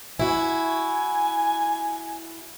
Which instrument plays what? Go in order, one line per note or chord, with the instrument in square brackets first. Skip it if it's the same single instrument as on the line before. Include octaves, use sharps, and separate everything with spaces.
[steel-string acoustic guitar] E4 F#4 [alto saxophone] G#5